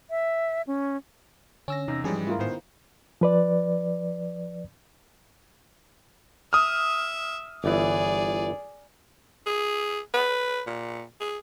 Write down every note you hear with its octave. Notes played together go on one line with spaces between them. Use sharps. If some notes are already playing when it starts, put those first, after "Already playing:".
E5
C#4
D3 C#4 E6 A#6
E2 C3 D#4
G#2 E3 F3 G3 G#3 C#4 G#4
A3 E4 F4 A#4
A2 D#3 B3 C5
F3 B4 D5
E5 D#6 F6
G1 E3 G#4 D5
G#4
B4
A#2
G#4